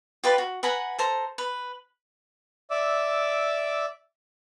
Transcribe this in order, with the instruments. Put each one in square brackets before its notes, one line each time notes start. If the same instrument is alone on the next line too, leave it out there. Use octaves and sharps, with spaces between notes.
[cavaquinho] F4 G4 B4 D5
F#4
B4 F#5 G#5 A#5
A4 C5 A#5
B4
[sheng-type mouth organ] D5 E5 D6 E6